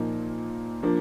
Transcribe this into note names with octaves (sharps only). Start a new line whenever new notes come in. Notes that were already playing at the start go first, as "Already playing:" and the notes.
Already playing: A#2 F3 A#3 D#4
F3 A#3 D4